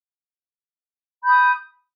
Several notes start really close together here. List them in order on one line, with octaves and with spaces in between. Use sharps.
B5 G6 D#6